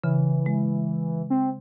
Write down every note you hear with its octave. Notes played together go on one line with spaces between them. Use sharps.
C#3 E3
G#3
C4